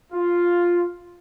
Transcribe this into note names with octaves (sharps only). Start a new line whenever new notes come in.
F4